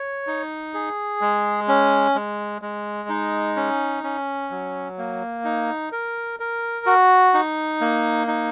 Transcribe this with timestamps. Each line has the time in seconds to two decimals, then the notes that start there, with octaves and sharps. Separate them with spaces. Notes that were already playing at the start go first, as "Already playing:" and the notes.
Already playing: C#5
0.27 D#4
0.74 G#4
1.21 G#3
1.68 C#4
2.15 G#3
2.62 G#3
3.09 D#4
3.56 C#4
4.04 C#4
4.50 F#3
4.98 A#3
5.45 D#4
5.92 A#4
6.40 A#4
6.86 F#4
7.34 D#4
7.81 A#3
8.27 D#4